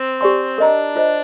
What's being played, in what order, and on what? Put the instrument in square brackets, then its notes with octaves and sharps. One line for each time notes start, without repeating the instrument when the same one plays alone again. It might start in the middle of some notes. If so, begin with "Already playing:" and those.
Already playing: [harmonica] C4
[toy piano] G4 D5 G#5 C6
[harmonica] D4 [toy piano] A#4 D#5 A#5
[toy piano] F4 C5 D#5